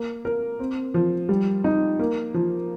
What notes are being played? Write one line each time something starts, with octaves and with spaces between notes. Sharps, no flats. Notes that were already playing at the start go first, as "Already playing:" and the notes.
Already playing: A#3
A#4
C4
F3
G3
D#4
A#3
F3